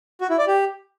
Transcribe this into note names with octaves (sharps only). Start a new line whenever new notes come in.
F#4
E4
D5
G4